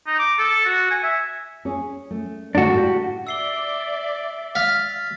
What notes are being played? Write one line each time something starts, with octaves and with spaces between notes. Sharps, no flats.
D#4
D6
A4
F#4
G#5
E5
C#4 G#4
A3
G#2 D3 A3 D4 F#4
A2 G4 F5
D5 E5 E6 C7 G7
F5 F6 A6 B6